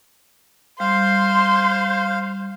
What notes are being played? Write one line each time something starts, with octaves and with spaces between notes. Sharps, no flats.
G3 C5 F5 C6